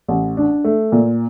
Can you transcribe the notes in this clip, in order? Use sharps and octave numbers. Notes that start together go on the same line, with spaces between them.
A1
D4
A3
A#2